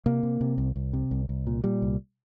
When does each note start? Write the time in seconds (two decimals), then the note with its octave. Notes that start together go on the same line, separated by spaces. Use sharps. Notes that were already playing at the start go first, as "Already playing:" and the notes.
0.06 C3 A#3
0.23 C3
0.41 C3
0.58 C2
0.76 C2
0.93 C3
1.11 C2
1.29 C2
1.47 A#2
1.64 A#2 G3
1.82 C2